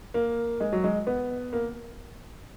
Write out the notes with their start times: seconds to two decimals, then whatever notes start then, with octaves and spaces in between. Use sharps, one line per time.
0.14 A#3
0.60 G#3
0.73 F#3
0.84 G#3
1.07 B3
1.53 A#3